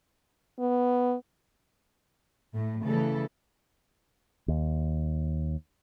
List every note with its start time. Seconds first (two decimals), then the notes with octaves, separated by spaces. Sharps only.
0.59 B3
2.54 A2 A3
2.85 C#3 E3 G3 A3 A4
4.48 D#2